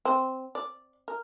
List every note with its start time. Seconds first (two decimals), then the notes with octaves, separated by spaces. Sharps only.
0.05 C4
0.55 D5
1.08 A#4